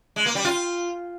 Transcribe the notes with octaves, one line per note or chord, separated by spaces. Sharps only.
G#3
A#3
G3
F4